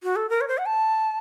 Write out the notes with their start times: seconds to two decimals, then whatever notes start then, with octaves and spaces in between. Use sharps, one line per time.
0.03 F#4
0.16 A4
0.30 A#4
0.41 C#5
0.48 C5
0.58 F#5
0.66 A5